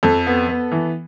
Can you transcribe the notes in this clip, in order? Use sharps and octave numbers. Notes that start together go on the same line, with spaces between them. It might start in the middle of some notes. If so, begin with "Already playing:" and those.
F2 A4
B3
B3
E3